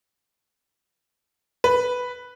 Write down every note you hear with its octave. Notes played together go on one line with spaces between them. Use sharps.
B4